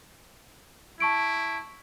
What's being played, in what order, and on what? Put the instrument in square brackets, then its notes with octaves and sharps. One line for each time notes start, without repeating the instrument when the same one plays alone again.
[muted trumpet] E4 [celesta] A5 C#6 D7